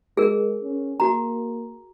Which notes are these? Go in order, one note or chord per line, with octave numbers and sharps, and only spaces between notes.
G#3 G#4 A#4
C#4
A#3 F#4 A#5